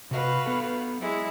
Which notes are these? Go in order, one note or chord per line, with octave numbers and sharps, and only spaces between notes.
C3 F#4 B4 D#5 F5
B3 A4
F#3 G#3 E4